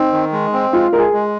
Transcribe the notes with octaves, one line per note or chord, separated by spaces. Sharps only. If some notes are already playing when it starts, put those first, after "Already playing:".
Already playing: C4 D#4
D#3
G#3
C4
G#3 F4
G#3 A#4
G#4
G#3